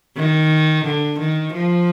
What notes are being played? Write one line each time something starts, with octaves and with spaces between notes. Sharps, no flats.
D#3
D3
D#3
F3